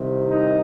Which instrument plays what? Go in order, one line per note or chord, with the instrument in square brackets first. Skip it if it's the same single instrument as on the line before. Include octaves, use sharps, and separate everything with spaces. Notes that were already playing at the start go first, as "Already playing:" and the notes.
Already playing: [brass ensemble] C2 C3 D#3
D#4